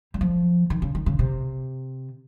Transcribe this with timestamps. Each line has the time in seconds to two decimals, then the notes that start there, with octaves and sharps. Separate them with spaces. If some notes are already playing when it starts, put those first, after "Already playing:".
0.14 G3
0.21 F3
0.70 D#3
0.82 C#3
0.95 D#3
1.06 C#3
1.19 C3